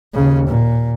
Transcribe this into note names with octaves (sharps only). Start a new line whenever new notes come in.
D#2 C#3
A#2